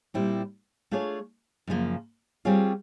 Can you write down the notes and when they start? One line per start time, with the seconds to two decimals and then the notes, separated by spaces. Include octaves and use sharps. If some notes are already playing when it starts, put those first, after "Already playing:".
0.14 A#2 G3 C4 E4
0.91 A3 D4 F4 G#4 C#5
1.67 F#2 C#3 F3 A#3
2.45 G3 C4 F4 G#4 C#5